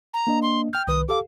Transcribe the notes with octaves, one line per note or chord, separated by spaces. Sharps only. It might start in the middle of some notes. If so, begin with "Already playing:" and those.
A#5
A#3 D4 D#5
C6
G5 F6 G6
C2 D#3 B4 D#6
G4 A4 F5 D6